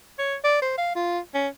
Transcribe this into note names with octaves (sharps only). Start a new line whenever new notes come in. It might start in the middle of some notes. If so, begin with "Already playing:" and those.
C#5
D5
C5
F5
F4
C#4